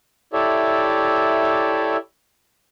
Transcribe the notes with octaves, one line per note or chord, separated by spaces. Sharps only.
E4 G4 A4 C#5 D5 E5